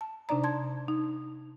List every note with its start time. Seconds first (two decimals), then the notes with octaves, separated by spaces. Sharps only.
0.01 A5
0.29 C3 D4 D#4 D5 A#5
0.44 A5 C6 G#6
0.88 D#4